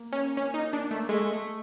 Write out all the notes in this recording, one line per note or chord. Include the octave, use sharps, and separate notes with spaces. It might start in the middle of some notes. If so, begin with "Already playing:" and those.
Already playing: A#3
C#4
C#4
D#4
D4
A3
G#3 A3
A3